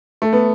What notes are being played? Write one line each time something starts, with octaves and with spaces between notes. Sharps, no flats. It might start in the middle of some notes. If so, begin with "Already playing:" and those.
A3
B3